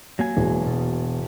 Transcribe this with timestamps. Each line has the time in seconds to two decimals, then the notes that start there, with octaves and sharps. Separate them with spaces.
0.19 F#3 A#3 G#5
0.37 E1
0.67 B2